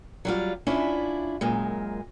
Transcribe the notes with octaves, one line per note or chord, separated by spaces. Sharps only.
F#3 G3 F4
C#4 D4 E4 F4 E5
F#2 A#2 G#3